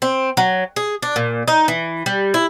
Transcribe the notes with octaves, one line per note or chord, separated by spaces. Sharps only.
C4
F#3
G#4
D4
A#2
D#4
E3
G3
E4